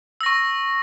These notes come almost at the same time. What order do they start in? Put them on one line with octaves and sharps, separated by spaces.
E6 A#6 C#6